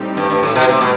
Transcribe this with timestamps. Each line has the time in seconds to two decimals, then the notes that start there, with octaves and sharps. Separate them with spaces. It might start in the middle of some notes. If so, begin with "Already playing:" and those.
Already playing: A2 G3 C4 D#4 G4
0.17 G2
0.30 G2
0.43 A2
0.56 B2
0.68 C3
0.81 B2